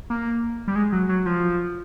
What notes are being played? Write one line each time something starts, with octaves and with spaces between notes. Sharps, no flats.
A#3
G3
G#3
F#3
F#3
F3